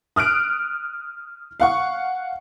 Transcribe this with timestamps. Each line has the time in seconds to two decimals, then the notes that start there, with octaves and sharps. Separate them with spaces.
0.16 D#6 F6 F#6 D7
1.60 F5 F#5 C#6